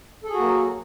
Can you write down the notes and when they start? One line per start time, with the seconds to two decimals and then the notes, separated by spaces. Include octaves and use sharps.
0.24 A4
0.29 G#4
0.34 F#4
0.39 A#3
0.44 F#3